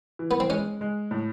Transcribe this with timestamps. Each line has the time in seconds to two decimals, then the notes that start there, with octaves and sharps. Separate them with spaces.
0.19 E3
0.31 B3
0.40 C4
0.50 G#3 C#4
0.81 G#3
1.11 A2